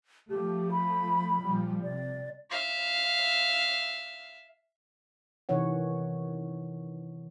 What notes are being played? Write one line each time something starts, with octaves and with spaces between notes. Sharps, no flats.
F3 A3 G4
B5
A#2 F3 G3
C3 D5
E5 F5
C3 D#3 E3 C#5 F#5